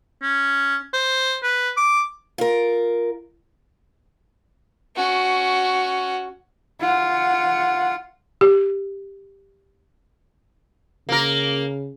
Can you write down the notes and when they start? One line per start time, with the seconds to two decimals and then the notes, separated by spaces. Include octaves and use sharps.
0.22 C#4
0.93 C5
1.43 B4
1.77 D6
2.38 F4 A#4
4.96 C#4 F#4
6.81 F4 F#5
8.41 G4
11.09 C#3 A#3 A#4